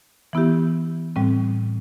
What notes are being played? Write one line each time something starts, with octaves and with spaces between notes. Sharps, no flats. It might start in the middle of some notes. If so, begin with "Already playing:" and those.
E3 B3 E4 G4
A2 G3 C4